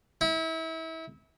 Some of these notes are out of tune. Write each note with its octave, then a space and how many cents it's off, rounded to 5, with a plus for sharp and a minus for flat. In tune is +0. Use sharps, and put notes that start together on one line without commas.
E4 -30